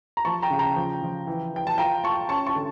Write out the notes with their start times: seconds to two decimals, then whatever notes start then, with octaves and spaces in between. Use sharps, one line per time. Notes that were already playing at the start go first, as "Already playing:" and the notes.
0.17 A#5
0.25 F3 A5 C#6
0.42 G5 A#5
0.51 C#3
0.59 G5 A#5
0.76 F3
1.02 F3
1.27 E3
1.54 E3 G5
1.67 A5
1.78 F4 G5 A#5
2.04 F4 A5 C#6
2.29 C#4 A5 C#6
2.47 A5 C#6
2.56 D3